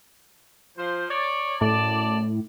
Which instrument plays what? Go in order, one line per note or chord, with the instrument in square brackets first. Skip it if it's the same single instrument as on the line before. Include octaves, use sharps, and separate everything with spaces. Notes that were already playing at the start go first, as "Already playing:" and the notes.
[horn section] F3 C5
C#5 D5
[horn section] F#2 D5 A5 [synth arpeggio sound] A2